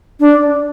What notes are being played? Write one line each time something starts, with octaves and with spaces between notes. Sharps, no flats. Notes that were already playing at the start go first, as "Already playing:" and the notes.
D4